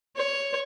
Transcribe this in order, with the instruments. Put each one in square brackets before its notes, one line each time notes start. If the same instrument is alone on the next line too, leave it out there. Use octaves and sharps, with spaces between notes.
[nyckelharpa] C#5